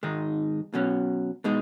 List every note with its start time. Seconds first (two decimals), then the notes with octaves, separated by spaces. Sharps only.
0.03 G#2 D#3 G#3 D#4
0.74 B2 F#3 C#4
1.44 B2 G#3 D#4